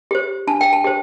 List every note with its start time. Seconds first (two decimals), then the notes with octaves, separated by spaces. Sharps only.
0.11 G4 C5
0.47 D4 A5
0.61 G5
0.73 A5
0.84 G4 C5